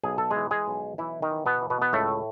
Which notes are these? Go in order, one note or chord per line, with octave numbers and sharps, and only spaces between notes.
B1 G#4
A4
G#3 G#4
E3
G#3 G#4
B1
B1 E3 E4
D#3 D#4
E3
B2 B3
E3
B2 B3
B3
C#2 A2 A3